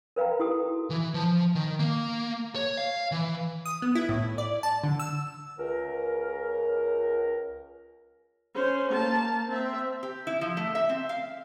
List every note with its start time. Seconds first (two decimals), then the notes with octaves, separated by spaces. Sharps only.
0.16 A#4 B4 F5 G5 A#5
0.39 E4 F#4 G4 A4 D#6
0.90 E3
1.14 F3
1.55 D#3
1.80 A#3
2.56 C#5
2.77 F5
3.12 E3
3.66 D#6
3.82 B3
3.95 E4
4.09 A2
4.38 D5
4.63 A5
4.84 D3
4.99 E6
5.59 C#2 A#4
8.55 C#4 C5
8.92 A#3 A5
9.49 C4 E5
10.03 G4
10.27 E4
10.41 F3
10.57 A3
10.75 E5
10.89 C4
11.09 F5